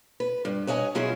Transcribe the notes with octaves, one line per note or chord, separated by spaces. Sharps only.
B4
G2
B4 C#5 D#5 E5 G#5
B2 F#3 C#4 E4 F4 G#4